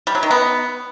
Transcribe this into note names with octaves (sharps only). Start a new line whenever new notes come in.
G3
F#3
D#3
B3